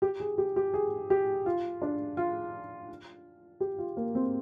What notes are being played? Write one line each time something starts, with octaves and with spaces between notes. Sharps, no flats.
G4
G#4
G4
G4
G#4
G4
F4
D4
F4
G4
F4
A#3
C4